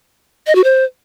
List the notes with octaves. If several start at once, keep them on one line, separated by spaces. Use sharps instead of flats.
D#5
F#4
C5